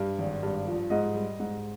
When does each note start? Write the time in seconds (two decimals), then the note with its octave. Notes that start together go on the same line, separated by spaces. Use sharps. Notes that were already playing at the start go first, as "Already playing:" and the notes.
Already playing: G2
0.18 G#1
0.43 G2
0.67 F3
0.90 G#2 D#5
1.15 G3
1.40 G#2